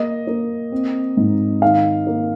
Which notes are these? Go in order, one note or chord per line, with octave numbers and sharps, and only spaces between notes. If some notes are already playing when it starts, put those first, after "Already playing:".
Already playing: A#3 D#5
A#3
C4
G#2
D#3 F5
A#3